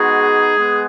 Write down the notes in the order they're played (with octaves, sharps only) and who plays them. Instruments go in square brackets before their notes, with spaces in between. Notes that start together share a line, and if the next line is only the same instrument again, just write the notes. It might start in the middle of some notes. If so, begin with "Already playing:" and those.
Already playing: [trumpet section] G#3 B3 D#4 F#4 G#4
G#3 B3